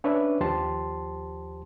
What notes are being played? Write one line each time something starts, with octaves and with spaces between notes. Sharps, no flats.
C#4 D4 B4 C#5 D5 E5
D#2 F3 G4 C5 A5 C6